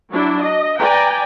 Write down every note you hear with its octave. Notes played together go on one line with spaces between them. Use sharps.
F#3 D4 E4
D#5
B4 D5 G5 G#5 A#5